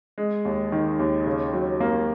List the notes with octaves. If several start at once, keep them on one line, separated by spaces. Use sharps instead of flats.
G#3
D#2
D#3
D#2
C#3
F#3
A#3